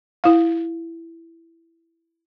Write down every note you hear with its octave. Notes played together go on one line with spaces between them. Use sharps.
E4 F5